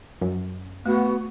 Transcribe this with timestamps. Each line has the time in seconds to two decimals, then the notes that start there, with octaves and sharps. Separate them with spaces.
0.21 F#2
0.86 A3 B3 F#4